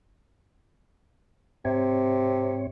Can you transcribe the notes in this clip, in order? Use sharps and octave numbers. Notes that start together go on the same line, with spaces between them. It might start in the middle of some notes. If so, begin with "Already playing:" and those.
G#2 C3 C4 C#5